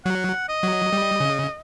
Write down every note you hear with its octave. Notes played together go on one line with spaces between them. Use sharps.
F#3 F#5
D#5
F#3
G3
C#3